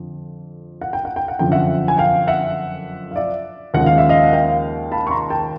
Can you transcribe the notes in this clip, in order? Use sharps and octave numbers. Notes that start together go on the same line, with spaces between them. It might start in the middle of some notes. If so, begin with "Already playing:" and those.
Already playing: F2 D3
F#5
G5
F#5
G5
F#5
F#1 F2 D3 G5
E5 F#5
G#5
F5 G5
E5 F#5
F5
D5 E5
D#2 C#3 F3 G#3 F#5
F5
E5
D#5 F5
F#5
F5 G5
A5 B5
C#6
A#5 C6
G5 A5